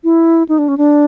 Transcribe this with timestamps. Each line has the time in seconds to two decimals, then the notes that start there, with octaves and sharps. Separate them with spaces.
0.04 E4
0.49 D#4
0.59 D4
0.68 C#4
0.78 D4